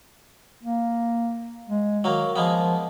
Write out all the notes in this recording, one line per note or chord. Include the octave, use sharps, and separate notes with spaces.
A#3
G#3
D#3 F#3 A#3
F3 G#3 A#3 B3